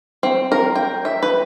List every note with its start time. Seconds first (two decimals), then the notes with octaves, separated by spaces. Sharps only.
0.23 C4
0.52 A#4
0.75 G5
1.05 E5
1.23 B4